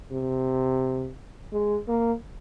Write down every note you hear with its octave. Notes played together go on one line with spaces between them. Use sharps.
C3
G#3
A#3